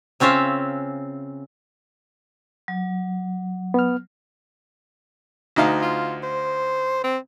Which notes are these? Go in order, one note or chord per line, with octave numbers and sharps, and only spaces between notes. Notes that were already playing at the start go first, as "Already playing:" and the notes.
C#3 C4 C#4 F4 E5
F#3
B3 F6
D2 D#4 F5
F4
C5
C4